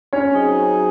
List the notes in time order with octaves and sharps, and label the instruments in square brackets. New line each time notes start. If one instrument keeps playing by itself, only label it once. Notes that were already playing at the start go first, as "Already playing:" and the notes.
[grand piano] C#4 C#5
[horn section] F#3 C4 D#4 G#4